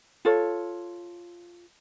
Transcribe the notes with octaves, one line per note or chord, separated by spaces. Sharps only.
F4 A4 C#5